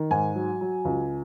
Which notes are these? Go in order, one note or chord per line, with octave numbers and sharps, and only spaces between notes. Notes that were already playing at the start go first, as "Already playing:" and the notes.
Already playing: D#3
G#2 G#5
F#3
F#3
C#2